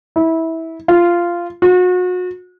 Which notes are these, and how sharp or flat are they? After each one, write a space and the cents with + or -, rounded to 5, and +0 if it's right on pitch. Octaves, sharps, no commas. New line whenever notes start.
E4 -20
F4 -10
F#4 -35